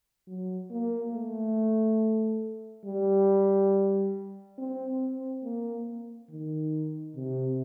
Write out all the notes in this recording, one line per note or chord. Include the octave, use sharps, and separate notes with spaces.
F#3
A#3
A3
G3
C4
C4
A#3
D#3
C3